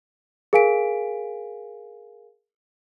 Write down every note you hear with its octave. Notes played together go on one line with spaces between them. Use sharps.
G#4 A#4 F5 G#5 B6 D7